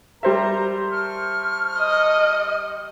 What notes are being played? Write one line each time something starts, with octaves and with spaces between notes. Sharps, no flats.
G3 A#4 C5 E5 A#5
A5 C#6 F6
D#5